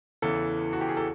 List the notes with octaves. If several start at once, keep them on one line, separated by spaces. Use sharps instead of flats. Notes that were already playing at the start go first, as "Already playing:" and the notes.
E2 C#3 E3 A4
F#4
G4
G#4
A4